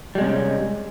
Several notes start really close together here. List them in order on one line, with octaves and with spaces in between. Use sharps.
G3 G#3 C3 C#4